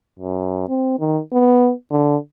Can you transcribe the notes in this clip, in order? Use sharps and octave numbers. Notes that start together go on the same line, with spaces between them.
F#2
C4
D#3
B3
D3